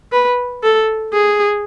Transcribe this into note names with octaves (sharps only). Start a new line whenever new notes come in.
B4
A4
G#4